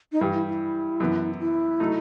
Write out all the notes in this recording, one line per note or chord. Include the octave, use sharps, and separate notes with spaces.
D#4
G2 E3 G3 E4
E4
E4
F#2 E3 B3
E4
F#3 A3 D#4